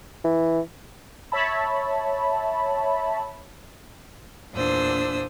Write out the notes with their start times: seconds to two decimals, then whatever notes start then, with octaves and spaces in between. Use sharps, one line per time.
0.24 E3
1.32 C#5 E5 A5 B5
4.53 E2 A#2 D4 C5 D#6 E6